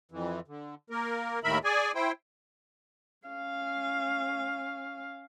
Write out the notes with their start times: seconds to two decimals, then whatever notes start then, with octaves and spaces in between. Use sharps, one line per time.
0.12 F2 E3
0.48 D3
0.90 A#3 A#4
1.44 D#2 A2 D#3 A#4 E5 B5
1.64 G#4 D5 G#5
1.95 E4 C5 G5
3.27 C#4 F5